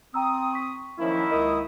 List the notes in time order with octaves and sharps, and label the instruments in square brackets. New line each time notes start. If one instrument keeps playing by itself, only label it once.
[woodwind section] C4 D#6 [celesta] G5 A#5 E6
[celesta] C#6 B6
[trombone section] D#3 A#3 E4 [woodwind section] F3 F#3 C#4
[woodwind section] C#2 D#6 [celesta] A#4 D#5